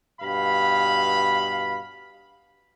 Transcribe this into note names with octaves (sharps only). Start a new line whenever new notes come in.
G2 B2 F5 B5